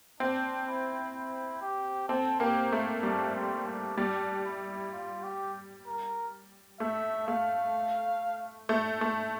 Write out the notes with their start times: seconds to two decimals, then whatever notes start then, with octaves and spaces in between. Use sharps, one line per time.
0.20 C4 D4
0.67 E4
1.15 E4
1.62 G4
2.09 C4 A4
2.40 A#3 G4
2.72 A3
3.03 G3 D4
3.35 C4
3.66 D4
3.97 G3 D4
4.45 E4
4.92 F4
5.24 G4
5.87 A#4
6.80 A3 E5
7.27 A3 F5
8.69 A3
9.01 A3